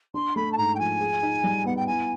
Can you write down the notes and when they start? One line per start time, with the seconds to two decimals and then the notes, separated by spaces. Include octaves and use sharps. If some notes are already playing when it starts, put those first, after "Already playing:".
0.14 D4 C6
0.36 A3 B5
0.52 A5
0.57 G#2 A#5
0.75 G5
0.79 F3 G#5
1.00 G#4
1.23 D#4
1.44 G3
1.66 B3 F#5
1.76 G5
1.87 E4 G#5